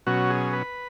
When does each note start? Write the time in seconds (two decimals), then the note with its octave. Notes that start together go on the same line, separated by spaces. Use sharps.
0.07 B2 F#3 C#4 F#4
0.30 G#4
0.53 B4